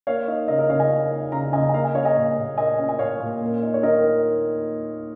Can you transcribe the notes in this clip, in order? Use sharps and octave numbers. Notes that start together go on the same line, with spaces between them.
A#3 C#5 F5
D#4
C#3 A#4 D#5
A#4 D#5
C#3 C#5 F5
D#5 G#5
A#3
D#4
C#3 F5 A#5
C#3 D#5 G#5
G#5
A#3 F5 A#5
D#5 G#5
C#4 C#5 F5
D#5 G#5
A#2
A#2
A#3 D#5 G#5
C#4
G#5
A#2 C#5 F5
A#2
A#3
D#4
C#5
D#3 A#4 D#5